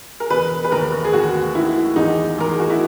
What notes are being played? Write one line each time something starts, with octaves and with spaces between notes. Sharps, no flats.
A#4
E1 B4
B4
D#2 A#4
G#4
D#2 F#4
D#3 E4
E2 D#4
E2 A#4
G#4
F#4
E4